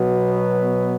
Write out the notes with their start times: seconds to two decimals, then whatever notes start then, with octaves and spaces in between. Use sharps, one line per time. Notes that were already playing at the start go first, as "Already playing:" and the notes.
Already playing: B2 F#3 B3
0.32 B4